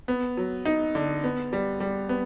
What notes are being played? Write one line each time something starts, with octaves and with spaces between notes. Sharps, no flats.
B3
F#3
D#4
D3
B3
G3
G3
B3